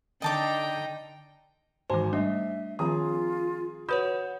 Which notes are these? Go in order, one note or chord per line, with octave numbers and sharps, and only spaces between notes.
D3 D#4 D#5 G5 A5 D6
G#1 E3 F#4 C5 G#5 C6
G3 A3 D4 D#5 E5
D#3 F3 C4 F4 G#4 A#5 D#6
F#4 B4 C#5 F#5 B5 D#6 G6